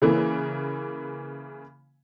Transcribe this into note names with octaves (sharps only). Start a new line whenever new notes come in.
C#3 E3 A#3